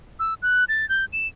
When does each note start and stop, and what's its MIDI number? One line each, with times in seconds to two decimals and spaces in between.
0.20 0.34 88
0.42 0.65 90
0.69 0.88 93
0.89 1.05 91
1.13 1.27 100